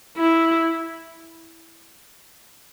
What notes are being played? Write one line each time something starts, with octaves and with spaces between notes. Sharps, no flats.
E4